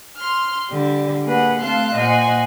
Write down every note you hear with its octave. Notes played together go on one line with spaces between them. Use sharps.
C6 F6
D3 G3
A#3 G#4 B4 F#5
A3 C4 F5 A5 C6 F#6
A#2 C5 D#5 F#5 G#5